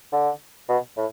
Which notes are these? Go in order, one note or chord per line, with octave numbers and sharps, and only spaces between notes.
D3
B2
A2